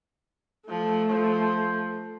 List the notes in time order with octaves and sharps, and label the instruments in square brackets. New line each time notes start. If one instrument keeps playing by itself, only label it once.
[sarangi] F3 [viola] A3
[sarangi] F3 [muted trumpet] C5